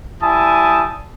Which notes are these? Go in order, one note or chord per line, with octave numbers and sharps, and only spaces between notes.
G3 E4 G#5 A5 D#6